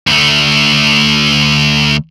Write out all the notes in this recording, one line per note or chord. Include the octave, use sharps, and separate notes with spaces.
D2 A3